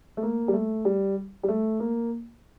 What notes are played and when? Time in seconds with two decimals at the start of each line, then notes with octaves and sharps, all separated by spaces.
0.17 A3
0.23 A#3
0.48 G3
0.53 A3
0.85 G3
1.43 G3
1.48 A3
1.80 A#3